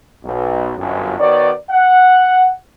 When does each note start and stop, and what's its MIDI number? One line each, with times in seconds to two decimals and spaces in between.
0.25 0.73 35
0.77 1.16 31
0.77 1.16 42
1.20 1.51 51
1.20 1.51 59
1.20 1.51 66
1.20 1.51 73
1.20 1.51 74
1.70 2.49 78